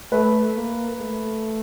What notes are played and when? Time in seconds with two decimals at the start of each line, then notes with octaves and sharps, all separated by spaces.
0.12 A3 B4
0.56 A#3
1.01 A3